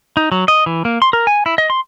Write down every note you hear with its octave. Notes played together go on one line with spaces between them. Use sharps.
D#4
F#3
D#5
E3
A#3
C6
A#4
G#5
E4
D#5
C6